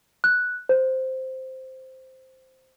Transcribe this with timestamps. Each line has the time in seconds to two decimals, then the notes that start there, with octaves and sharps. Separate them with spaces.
0.24 F#6
0.69 C5